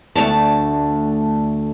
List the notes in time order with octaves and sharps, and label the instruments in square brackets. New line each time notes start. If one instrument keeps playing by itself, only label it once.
[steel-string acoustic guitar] D2 A3 D4 A5